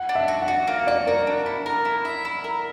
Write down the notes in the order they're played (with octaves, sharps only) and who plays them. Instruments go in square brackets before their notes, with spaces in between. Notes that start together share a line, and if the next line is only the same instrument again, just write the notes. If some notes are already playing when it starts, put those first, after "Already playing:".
Already playing: [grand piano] F#5
[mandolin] D4
[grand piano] E5
[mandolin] F#4
[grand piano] F#5
[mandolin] F#4
A#3
[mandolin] F#4 [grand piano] D5
[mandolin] F#4 [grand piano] A#4
[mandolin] D4
E4
A#4
E4
E5
E4
A#4